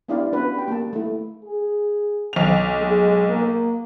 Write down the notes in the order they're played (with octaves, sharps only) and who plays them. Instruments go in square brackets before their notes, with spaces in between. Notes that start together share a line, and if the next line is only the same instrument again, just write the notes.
[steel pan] B3 D4 E4 G4 D5 F5
B3 C#4 D4 F#4 B4
G4 G5
A#3 G4 A5
A3 E4
[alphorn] G#4
[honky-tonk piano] B1 F7
[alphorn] G#3
A#3